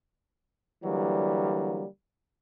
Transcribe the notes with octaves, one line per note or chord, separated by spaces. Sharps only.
D3 E3 F#3 G3 A#3